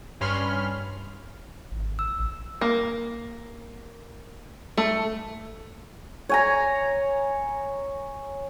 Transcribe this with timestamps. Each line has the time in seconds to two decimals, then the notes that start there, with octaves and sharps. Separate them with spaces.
0.21 G2 C#4 C#5 B5 C6 F6
1.71 G#1
1.99 E6
2.17 A#1
2.61 A#3
4.77 A3
6.29 C#5 G#5 A#5